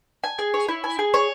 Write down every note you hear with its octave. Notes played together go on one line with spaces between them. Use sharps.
G#5
G#4
C#5
E4
G#5
G#4
C#5